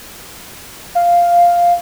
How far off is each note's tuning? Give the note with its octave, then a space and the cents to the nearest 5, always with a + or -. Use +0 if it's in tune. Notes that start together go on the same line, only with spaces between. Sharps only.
F5 -5